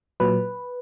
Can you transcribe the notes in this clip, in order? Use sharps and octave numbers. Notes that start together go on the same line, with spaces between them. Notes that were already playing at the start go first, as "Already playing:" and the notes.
A#2 F#3 B4